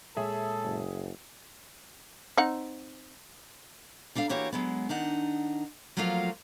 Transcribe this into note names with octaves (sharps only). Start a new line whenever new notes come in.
A#2 G#3 G#4 A4 C#5 E5
F#1
C4 D#4 F#5
G3 D4 A4 F5
E3 A#3 F#4 G4 C#5
F#3 G#3 B3
D#3 D4 D#4 F#5
F3 F#3 A3 A#3 F4 F5